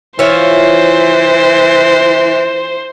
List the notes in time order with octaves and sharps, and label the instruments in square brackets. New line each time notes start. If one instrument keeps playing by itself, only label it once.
[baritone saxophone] E3 [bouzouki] F4 C#5 E5 [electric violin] C5